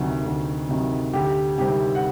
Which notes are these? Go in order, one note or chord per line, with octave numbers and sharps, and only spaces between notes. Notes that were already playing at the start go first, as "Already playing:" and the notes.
Already playing: D2 C3 D#3 F#3
D2
C3 D#3 F#3
D2 G4
C3 D#3 G3 C4 G4
F#5